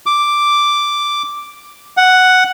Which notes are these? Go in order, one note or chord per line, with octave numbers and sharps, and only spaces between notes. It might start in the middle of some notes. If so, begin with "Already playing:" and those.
D6
F#5